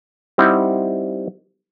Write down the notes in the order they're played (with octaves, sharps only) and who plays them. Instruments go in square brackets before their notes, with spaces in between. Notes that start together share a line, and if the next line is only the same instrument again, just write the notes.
[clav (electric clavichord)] G3 C4 D#4 E4 F#5